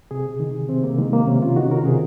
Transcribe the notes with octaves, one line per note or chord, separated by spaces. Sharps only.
C3 G#4
D#3
C3 C4
A#3
D#3 G#3
A#3
C3 C#4
F4
D#3 F#4
A#4
C3 G#4